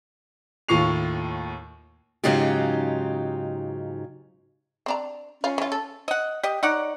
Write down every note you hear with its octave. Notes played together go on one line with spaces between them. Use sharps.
D#2 A2 F4 C#6 C7 F7
G#2 C#3 F#3 D#4 F4 G4
C4 D4 A#5
C#4 F4 F5
E3 F4
A4
D#5 F#5
G4 D#5
D#4 C#5 D5 F#5